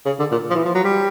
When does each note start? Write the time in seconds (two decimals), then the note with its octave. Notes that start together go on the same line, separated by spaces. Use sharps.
0.06 C#3
0.19 D3
0.32 A#2
0.51 F3
0.55 E3
0.65 F3
0.75 F#3
0.84 G3